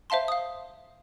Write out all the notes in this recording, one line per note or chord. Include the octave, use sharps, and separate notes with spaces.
C5 E5 F5 A5 C6
F5 D#6